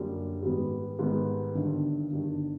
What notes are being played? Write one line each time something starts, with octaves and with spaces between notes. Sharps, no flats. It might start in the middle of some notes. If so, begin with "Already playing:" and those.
Already playing: F#2 D3 G3 A#3 D4
G#2 D#3 G3 B3
G#2 D#3 G3 B3
G1 G2 D#3
G1 G2 D#3